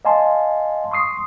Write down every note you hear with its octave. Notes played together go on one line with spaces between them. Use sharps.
D#5 F5 G#5 A5 C6
C6 C#6 D#6 C7